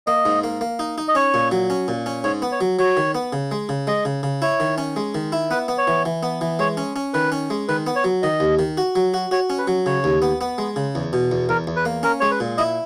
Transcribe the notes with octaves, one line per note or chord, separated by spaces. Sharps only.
A#3 D#5
G#2
A#3
A#3
D#4
D#4
D#5
C#4 C#5
A#2
F#3
C#4
A#2
C#4
G#2 C#5
B3
C#5
F#3
F#3 C#5
D#3
B3
C#3
G#3
C#3
G#3 D#5
C#3
C#3
E4 C#5
D#3
C#4
G#3
D#3
E4
B3 B4
B3
C#5
E3
E3
B3
E3
G#3 C#5
C#4
C#4
D#3 B4
C#4
G#3
D#3 B4
B3
C#5
F#3
D#3 D#5
D#2
D#3
F#4
F#3
F#4
F#4 C#5
C#4
B4
F#3
C#3 C#5
D#2
B3
B3
G#3
C#3
E2
B2
E2
E2 A#4
E2
B4
A#3
C#4 A#4
G#3 C#5
B4
A#2
E4 D#5